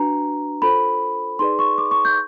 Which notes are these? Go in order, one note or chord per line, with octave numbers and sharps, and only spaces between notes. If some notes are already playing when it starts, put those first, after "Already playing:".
Already playing: D4 F#4 B4 A#5
F4 A4 C5 B5
D#4 G#4 B4 D5 C6
C#6
D6
C#6
G6